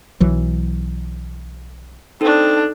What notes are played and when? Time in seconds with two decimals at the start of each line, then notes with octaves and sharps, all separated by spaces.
0.20 B1 E3 F#3
2.21 C4 D4 D#4 A4